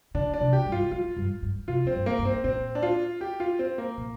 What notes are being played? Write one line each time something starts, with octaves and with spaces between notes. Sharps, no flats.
D3 D4
D4
C3
G4
G2
F4
F2 F4
G2
G2
C3 F4
F2 C4
G2
A#3
G2
C4
A#2 C4
D4
F4
G4
F4
C4
A#3
A#2